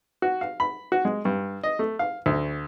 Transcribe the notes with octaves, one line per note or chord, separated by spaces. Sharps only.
F#4
F5
B5
F#4
G#3
G2
D#5
A3
F5
D2